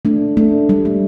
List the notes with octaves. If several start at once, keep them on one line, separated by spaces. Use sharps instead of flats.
A3 D4
A3 D4
G3
A3